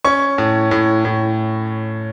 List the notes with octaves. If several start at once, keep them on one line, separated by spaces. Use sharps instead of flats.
C#4 C#6
A2
A2
A2